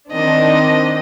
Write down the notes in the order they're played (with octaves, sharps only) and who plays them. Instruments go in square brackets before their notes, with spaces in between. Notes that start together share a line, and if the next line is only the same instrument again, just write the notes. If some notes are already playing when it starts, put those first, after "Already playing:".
[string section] D#3 C4 D4 [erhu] D#5